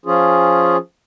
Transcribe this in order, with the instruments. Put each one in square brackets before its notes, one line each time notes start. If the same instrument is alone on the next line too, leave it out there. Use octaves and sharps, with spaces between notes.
[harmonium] F3 C#4 F4 G#4